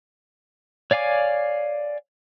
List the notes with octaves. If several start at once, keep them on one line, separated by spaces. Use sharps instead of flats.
C#5 D5 F5 G#5 D6